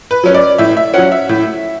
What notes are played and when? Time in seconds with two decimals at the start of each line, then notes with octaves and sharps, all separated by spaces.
0.11 B4
0.23 F#3 C#4
0.34 D5
0.58 A2 E5
0.77 E5
0.94 F#3 C#4 F#5
1.12 E5
1.29 A2